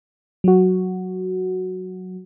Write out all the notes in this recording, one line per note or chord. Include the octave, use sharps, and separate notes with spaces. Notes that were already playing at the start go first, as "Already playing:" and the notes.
F#3 F#4